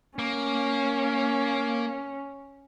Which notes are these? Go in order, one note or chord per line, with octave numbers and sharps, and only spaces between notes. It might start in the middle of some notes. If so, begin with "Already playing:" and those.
A#3 C#4